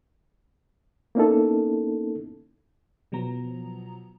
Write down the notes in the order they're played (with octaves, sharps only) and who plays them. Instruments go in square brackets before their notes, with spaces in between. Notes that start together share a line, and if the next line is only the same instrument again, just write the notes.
[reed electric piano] A#3 B3 C#4 D#4 E4 A4
[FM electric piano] B2 F3 F#3 B3 A#5